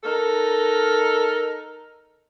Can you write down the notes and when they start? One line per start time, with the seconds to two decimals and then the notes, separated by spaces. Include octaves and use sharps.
0.04 D#4 A4 A#4